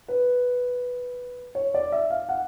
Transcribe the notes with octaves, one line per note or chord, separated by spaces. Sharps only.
B4
C#5
D5
E5
F5
F#5